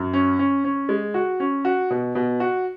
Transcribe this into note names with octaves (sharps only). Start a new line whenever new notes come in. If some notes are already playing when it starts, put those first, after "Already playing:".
Already playing: F#2
C#4
C#4
C#4
G#3
F#4
C#4
F#4
B2
B2
F#4